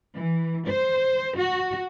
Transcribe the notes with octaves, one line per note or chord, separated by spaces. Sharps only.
E3
C5
F#4